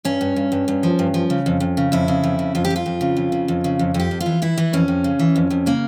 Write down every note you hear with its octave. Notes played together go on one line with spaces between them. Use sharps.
G2 C#4
G2
G2
G2
G2
F3
G2
F3
C#3
F2
F2
C#3
F2 E4
C#3
F2
C#3
F2 F4
G4
F2
F4
F2
C#3
F2
C#3
F2
C#3
F2
F2
G4
F2
F4
E3
E3 E4
E3
F2 C#4
F2
C#3
E3
F2
F2
C#3 A#3